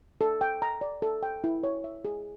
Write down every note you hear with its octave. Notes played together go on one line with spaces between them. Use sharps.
A4
G5
A#5
D5
A4
G5
E4
C#5
E5
G#4